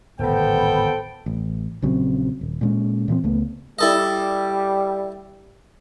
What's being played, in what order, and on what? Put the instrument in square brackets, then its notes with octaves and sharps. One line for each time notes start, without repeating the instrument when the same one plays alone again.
[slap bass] D1 G#1 B2 [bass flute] B3 [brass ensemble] A4 C5 G5
[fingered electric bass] A1
A#1 C#3 F#3 C4
D#1
A#2 G#3 C#4
A#2 E3 F3 C4
C#2 A3 B3
[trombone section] G3 [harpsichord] E4 A4 D#5